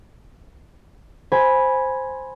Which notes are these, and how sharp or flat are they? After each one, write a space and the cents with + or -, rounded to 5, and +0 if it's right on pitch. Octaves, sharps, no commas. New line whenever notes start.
C5 +0 G#5 +0 B5 -10